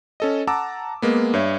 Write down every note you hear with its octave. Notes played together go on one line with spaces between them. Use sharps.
C#4 A4 D#5
F#5 A5 A#5 D6 E6
G#3 A#3 B3
G2 C#5 E5